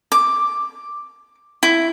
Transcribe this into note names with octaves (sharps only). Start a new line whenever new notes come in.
D6
E4